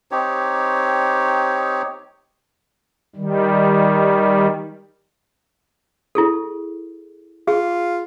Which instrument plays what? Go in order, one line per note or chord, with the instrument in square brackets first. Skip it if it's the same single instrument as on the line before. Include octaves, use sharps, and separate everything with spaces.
[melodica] C4 D#4 G4 C#5
[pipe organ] D#3 G3
[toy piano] E4 G#4 A4
[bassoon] F4 [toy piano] G#4